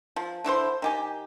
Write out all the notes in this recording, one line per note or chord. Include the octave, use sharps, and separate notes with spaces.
F3
D3 E4 F#4 C5
D#3 G4 G#5